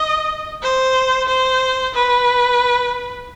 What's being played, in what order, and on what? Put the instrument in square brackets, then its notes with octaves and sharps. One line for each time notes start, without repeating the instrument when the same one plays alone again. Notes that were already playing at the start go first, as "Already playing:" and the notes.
Already playing: [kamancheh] D#5
C5
C5
B4